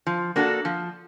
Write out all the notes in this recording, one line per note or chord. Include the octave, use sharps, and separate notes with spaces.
F3
A#3 D4 F#4 A4
F3